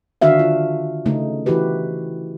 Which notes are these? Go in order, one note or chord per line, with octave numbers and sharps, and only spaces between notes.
D3 D#3 D4 F#4 E5 F5
F4
C#3 A3 D#4
E3 E4 F#4 G4 B4